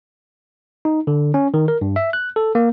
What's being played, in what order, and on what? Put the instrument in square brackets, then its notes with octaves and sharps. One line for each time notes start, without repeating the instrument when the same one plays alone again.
[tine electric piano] D#4
D3
C#4
D#3
A#4
G2
E5
F#6
A4
A#3